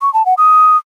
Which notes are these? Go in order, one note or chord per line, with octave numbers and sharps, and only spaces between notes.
C#6
A5
F#5
D#6